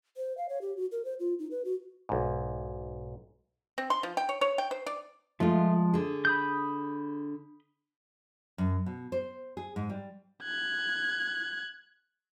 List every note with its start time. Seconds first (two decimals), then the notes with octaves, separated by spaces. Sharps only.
0.17 C5
0.37 F5
0.49 C#5
0.61 G4
0.77 F#4
0.92 A#4
1.05 C5
1.20 F4
1.39 D#4
1.51 B4
1.65 F#4
2.09 B1 G#2
3.78 C4
3.90 C6
4.03 F3
4.17 G5
4.29 C#5
4.41 C#5
4.58 G5
4.71 C5
4.86 D5
5.40 F3 G#3 A3 F4
5.94 D3 G#4
6.25 B5 D#6 G6
8.58 F#2
8.86 B2
9.12 C5
9.57 G#4
9.76 G#2
9.89 G3
10.43 F#6 G#6